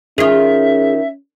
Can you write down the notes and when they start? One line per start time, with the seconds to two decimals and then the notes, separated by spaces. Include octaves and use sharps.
0.18 D#3 C#4 F4 G#4 E5